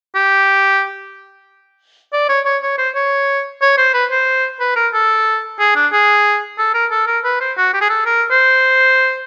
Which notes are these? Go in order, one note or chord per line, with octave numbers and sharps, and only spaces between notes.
G4
D5
C#5
C#5
C#5
C5
C#5
C#5
C5
B4
C5
B4
A#4
A4
G#4
D4
G#4
A4
A#4
A4
A#4
B4
C5
F#4
G4
G#4
A4
A#4
C5